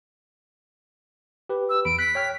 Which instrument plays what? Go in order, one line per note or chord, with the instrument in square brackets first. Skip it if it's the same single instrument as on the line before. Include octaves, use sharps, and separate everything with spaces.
[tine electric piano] G4 B4
[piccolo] E6
[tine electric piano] E2 B5 [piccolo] D7
[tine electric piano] F#6 [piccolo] B6
[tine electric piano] C#5 G5 F6